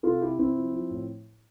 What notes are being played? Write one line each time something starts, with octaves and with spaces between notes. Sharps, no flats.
C3 F4 A4
C3 E4 G4
C3 C4 E4
F3
F3
A2